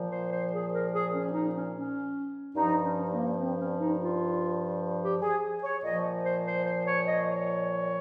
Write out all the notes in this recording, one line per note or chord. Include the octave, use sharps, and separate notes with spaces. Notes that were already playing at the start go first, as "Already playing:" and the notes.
Already playing: A#2 F3
C5
C5
G#4
A#4
G#4
C#4
D#4
C#4
C#4
G2 F3 D#4
C#4
A#3
C4
C#4
D#4
F4
G4
G#4
C#5
A#2 F3 D#5
C5
C5
C5
C#5
D#5
C#5